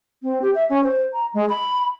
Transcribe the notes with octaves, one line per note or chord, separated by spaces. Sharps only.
C4
G4
E5
C#4
C5
A#5
G#3
B5